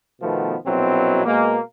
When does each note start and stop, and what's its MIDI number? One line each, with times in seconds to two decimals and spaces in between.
0.21 0.55 47
0.21 0.55 51
0.21 0.55 53
0.21 0.55 57
0.21 0.55 59
0.66 1.25 34
0.66 1.25 47
0.66 1.25 54
0.66 1.25 60
0.66 1.25 64
1.25 1.58 47
1.25 1.58 56
1.25 1.58 58